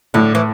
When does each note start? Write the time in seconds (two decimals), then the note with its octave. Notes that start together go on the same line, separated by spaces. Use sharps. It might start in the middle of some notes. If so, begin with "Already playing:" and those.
0.14 A2 D3
0.35 E3